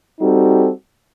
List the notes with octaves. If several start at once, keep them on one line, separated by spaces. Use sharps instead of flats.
G3 C4 D#4 F#4 A4